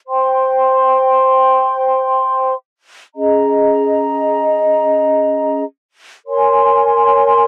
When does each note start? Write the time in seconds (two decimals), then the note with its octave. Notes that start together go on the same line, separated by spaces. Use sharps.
0.06 C5 G5 C6
3.15 C#4 G#4 D#5 A#5
6.26 A#4 C#5 G#5 C6